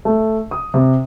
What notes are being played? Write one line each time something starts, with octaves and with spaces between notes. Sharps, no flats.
A3
D#6
C3